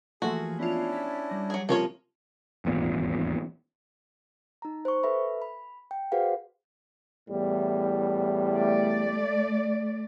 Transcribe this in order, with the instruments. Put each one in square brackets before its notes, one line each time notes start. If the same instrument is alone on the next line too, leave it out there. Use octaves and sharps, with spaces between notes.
[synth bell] E3 F3 A#3 [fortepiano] A3 [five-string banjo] F#4 [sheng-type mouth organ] G#4
[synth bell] B3 F4 [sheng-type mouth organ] C#4 D4 E4
[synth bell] A6 B6
G3 A#6
[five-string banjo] F#3 G#4
[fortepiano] C3 F3 F4 [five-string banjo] A#3 C#4 C#5
[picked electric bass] D#1 G#1 E2 A#2
[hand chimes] D#4 A#5
C5 C#6
A4 B4 E5 B5
B5
G5
F#4 G#4 B4 C5 F5 F#5
[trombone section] E2 A2 G3
[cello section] A3 D5